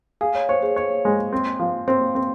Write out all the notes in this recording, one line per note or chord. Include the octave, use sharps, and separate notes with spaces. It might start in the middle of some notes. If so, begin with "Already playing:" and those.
G#4 F5
C#5
C5 C#5
G#4
C#5
G#3
C4
F3
C4 C5
C4